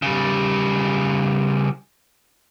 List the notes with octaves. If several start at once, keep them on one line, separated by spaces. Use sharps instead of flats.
C#3 G3